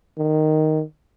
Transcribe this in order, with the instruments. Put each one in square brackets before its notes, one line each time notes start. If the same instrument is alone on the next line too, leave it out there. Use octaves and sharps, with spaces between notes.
[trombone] D#3